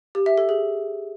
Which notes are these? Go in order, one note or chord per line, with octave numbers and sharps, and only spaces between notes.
G4
E5
A4
G#4